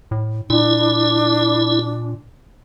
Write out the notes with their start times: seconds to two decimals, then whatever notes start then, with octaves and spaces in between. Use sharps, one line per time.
0.11 A2
0.50 A#2 D4 E4